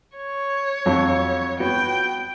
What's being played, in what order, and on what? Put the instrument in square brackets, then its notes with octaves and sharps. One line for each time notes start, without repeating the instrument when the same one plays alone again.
[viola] C#5
[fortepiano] F2 F#3
[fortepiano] B3 F#4 [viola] G5